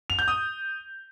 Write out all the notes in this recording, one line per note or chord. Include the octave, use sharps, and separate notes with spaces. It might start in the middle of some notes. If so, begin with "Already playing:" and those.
F7
G6
D#6